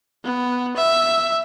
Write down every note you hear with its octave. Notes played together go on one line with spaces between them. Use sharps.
B3
E5